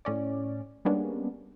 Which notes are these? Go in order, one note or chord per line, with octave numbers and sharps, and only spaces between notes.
A2 C#4 D5
G3 G#3 A#3 B3 C#4 D4